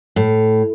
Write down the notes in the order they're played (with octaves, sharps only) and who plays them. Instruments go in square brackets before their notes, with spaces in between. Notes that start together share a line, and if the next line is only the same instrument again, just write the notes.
[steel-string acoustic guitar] A2